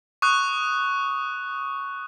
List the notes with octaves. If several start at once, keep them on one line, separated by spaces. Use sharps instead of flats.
C#6 D#6 F#6